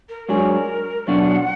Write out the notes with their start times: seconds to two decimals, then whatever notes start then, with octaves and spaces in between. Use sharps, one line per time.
0.09 A#4
0.29 G#2 F#3 D4 G#4 A#4
1.08 B2 F#3 D4 F#5